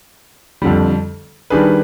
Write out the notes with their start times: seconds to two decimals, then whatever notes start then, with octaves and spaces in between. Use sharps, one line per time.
0.62 F2 D3 G3
1.50 D#3 G3 D4 G#4 B4